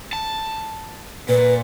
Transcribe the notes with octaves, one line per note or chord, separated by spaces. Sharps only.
A5
A#2 B4